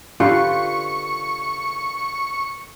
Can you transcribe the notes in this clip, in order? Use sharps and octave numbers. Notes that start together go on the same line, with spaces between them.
D3 F4 G4 B4 C#6